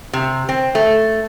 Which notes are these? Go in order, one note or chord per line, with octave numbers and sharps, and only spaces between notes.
C3
C4
A3